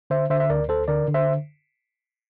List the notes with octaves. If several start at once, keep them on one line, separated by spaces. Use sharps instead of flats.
D3 C5 E5
D3 C5 E5
E5
D2 A#4 D5
D2 A4 C5
D3 A#4 D5
D3
C5 E5